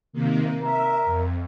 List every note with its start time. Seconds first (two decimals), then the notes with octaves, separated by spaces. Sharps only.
0.13 C3 D#3 A#3
0.62 A#4 E5
1.05 F2